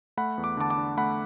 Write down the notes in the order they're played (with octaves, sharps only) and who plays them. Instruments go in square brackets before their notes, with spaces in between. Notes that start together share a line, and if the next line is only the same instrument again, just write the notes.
[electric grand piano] A3 F#5 B5
E2
D6
D3 A5 D6
A5 D6
D4
A3 F#5 B5